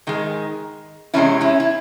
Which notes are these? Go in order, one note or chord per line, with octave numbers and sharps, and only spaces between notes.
G#2 D#3 G#3
E2 C3 E3 G#3 C#4 E4
C#4 E4
E4